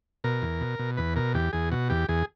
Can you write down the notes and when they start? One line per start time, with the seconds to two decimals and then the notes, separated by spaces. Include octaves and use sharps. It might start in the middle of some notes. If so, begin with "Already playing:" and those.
0.24 B2 A#4
0.42 E2
0.61 B2
0.79 B2
0.97 E2 B4
1.16 B2 A#4
1.34 E2 G4
1.53 E2 G#4
1.72 B2 F#4
1.90 E2 G4
2.09 E2 G#4